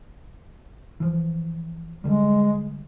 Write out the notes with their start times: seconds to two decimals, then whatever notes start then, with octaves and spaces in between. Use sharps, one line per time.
1.00 E3 F3
2.04 D3 G3 G#3